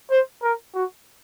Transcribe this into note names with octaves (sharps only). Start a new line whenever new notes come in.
C5
A#4
F#4